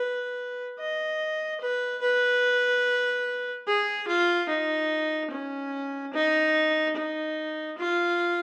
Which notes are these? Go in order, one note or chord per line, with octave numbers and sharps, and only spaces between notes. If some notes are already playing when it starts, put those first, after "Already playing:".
Already playing: B4
D#5
B4
B4
G#4
F4
D#4
C#4
D#4
D#4
F4